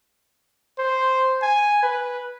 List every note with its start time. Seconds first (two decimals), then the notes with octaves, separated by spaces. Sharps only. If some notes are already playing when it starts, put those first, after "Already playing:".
0.79 C5
1.42 G#5
1.83 B4